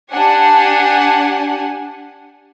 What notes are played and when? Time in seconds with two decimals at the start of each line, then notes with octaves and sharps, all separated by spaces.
0.11 D4 G4 F#5 G#5